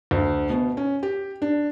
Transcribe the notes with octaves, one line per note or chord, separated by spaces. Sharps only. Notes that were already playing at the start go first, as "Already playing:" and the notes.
D2
B2
C#4
G4
D4